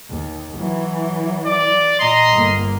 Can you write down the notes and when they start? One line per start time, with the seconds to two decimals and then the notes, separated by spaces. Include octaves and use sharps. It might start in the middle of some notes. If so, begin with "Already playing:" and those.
0.10 D#2
0.59 E3 F#3
1.45 D5
2.00 A#2 D#5 A#5 C6
2.32 G1 A#3